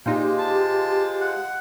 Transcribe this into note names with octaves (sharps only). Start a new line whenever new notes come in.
A#2 G#3 D#4 F4 G4 C5
A5
F#5